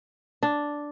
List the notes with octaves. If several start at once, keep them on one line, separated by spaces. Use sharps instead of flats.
D4